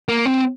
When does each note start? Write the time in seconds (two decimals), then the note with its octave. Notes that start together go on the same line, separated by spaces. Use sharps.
0.09 A#3
0.25 C4